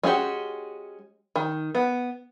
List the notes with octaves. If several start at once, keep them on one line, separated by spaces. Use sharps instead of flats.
G#3 C#4 F#4 G4
D#3
B3